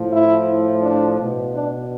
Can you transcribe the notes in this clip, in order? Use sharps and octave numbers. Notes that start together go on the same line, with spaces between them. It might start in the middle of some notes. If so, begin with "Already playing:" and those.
Already playing: A2 F3
E4
D4
B2
D4